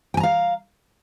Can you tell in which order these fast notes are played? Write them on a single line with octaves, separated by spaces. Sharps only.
G5 G#5 A#5 F5